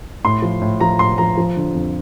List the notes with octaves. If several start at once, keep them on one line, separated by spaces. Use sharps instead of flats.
A2 C6
F3
A2
F3 A#5
A2 C6
F3 A#5
F3
D3
F2